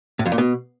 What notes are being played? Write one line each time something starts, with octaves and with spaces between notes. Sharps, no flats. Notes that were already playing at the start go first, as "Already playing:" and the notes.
A2
F2
A#2
B2